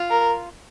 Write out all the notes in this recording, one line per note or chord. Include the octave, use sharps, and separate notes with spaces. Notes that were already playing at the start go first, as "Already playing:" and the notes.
Already playing: F4
A#4